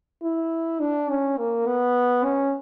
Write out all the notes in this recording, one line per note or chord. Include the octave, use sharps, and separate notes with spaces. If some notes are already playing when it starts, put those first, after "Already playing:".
E4
D4
C#4
A#3
B3
C#4